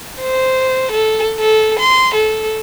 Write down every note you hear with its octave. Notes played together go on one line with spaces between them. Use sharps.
C5
A4
A4
C6
A4